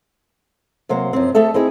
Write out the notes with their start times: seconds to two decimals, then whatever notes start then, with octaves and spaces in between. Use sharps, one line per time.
0.89 C3 F#3 A#3 C5
1.13 F#2 F3 C4
1.35 A3 G#4 A4 E5
1.54 C4 D#4 E4 G#4